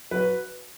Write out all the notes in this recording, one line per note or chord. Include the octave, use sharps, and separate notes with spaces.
F#3 B4